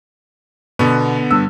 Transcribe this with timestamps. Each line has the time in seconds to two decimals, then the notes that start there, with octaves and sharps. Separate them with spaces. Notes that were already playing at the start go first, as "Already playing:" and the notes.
0.79 B2 D3 B3
1.31 G2 E6